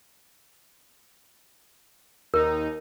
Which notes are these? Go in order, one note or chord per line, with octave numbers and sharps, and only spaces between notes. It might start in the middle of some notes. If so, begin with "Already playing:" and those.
D#2 D#4 A#4